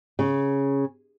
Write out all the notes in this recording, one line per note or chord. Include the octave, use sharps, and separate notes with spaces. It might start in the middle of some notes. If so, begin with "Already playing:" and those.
C#3